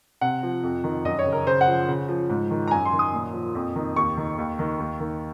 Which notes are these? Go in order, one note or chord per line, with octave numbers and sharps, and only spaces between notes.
C3 F#5
F3
F2
D#3
F#2 D#5
C#5
C#3
A#4
C#3 C5
F#5
F3
C#3
F3
G#2
D#3
A#5
F#2 G#5
C6
D#3
D#6
A#2
F3
F2
D#3
D#2 C#6
D#3
D#2
D#3
D#2
D#3